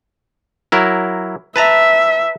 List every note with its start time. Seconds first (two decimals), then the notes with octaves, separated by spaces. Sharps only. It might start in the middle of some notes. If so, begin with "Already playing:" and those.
0.72 F#3 E4 A#4
1.56 B4 E5 A5 A#5